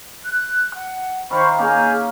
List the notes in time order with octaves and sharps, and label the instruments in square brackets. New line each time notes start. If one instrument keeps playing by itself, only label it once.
[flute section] F#6
F#5
[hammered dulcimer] D#3 F5 [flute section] C5 B5 C#6
[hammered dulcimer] A#3 C#4 [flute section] G#4 A#5 G6